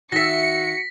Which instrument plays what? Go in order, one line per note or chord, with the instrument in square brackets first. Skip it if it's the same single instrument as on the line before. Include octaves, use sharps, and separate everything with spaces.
[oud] D#3 E5 [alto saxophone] F#4 [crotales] A#6 B6 [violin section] C#7